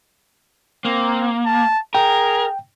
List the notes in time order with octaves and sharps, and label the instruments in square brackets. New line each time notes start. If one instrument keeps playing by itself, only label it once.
[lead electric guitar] A#3 [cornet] C4
[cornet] A5
[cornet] G#4 [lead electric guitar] A#4 [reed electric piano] G5